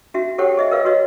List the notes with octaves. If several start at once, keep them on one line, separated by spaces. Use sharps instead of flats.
C#4 F#4 E5
G4 A4 C5 C#5 F#5 G5
G#4 D#5 E5
A#4 B4 C#5 F5
F#4 B4 C#5 D#5